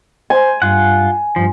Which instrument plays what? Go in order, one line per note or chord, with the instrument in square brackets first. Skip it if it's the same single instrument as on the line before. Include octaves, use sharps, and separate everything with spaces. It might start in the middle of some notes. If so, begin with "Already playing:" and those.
[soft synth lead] C5 [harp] G#5
[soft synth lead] G2 [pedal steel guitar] F4 F#5
[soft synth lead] G2 [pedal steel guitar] F3